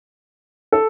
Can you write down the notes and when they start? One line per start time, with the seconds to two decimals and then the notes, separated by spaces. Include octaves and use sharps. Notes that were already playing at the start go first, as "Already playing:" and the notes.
0.73 A4